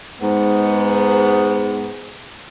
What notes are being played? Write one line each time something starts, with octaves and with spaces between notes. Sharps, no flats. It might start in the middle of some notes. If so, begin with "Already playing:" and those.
G#2 B3